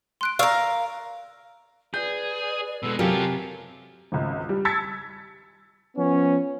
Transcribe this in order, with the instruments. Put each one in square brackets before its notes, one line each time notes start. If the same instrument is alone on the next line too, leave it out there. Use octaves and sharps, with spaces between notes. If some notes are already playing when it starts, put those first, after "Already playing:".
[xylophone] C6 F#6 D7
[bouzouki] A#4 F5 [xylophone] D5 C#6 E6
[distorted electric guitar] G#4 [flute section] B4 D5 [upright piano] G6
[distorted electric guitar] B2 G#3 [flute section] A4 B4 E6
[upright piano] C3 G4 A#4 [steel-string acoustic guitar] F#3 [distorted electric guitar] F4 A4 [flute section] F5 G#5
[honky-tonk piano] G#1 C#2
G3
A5 E6 G#6 A6 B6 C#7
[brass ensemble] F3 B3 C#4